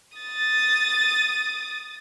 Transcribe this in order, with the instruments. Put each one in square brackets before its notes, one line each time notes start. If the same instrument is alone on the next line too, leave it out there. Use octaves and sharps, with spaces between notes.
[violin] D#6 A6